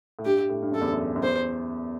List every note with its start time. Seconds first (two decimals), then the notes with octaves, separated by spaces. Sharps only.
0.19 A2
0.25 G2 G4
0.50 A2
0.62 G2
0.72 F#2 A4
0.81 E2
0.92 F#2
1.16 F#2
1.23 E2 C5